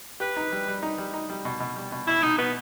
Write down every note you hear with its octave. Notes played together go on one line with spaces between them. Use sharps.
G4 B4
D#4
G3
G3
D#4
G3
D#4
G3
B2
B2
G3
B2
B2 E4
B2 D#4
B2 B3